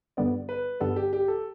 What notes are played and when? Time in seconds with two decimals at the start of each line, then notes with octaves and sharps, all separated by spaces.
0.17 G2 D3 G3 B3 D5
0.49 B4
0.80 G2 D3 G3 B3 A4
0.96 G4
1.13 G4
1.28 A4